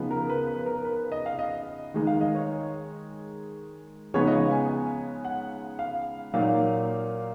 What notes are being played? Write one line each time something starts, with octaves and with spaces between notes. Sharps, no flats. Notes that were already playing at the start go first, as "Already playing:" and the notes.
Already playing: C#3 F3 B3 D#4
A#4
B4
B4
A#4
B4
D#5
F5
D#5
D#3 G#3 D#4
F5
D#5
C#5
C#3 F3 G#3 B3 D#4 C#5
D#5
F5
G#5
G#5
F#5
F5
A#2 F#3 A#3 D#4 F5